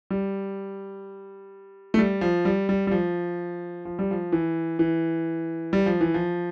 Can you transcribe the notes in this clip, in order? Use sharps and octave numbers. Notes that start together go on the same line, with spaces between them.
G3
A3
G3
F3
G3
G3
G3
F3
F3
G3
F3
E3
E3
G3
F3
E3
F3